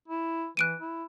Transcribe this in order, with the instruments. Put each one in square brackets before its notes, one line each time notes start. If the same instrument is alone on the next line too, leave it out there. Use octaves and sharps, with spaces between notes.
[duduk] E4
[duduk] E3 [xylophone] F#6 D7 D#7
[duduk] E4